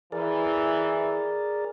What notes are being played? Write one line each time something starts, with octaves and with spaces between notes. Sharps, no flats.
E3 G#4 A#4 D5